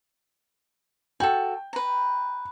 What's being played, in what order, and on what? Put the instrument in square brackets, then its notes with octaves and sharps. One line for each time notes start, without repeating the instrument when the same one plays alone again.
[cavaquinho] F#4 A4 [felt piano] G5
[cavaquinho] B4 A#5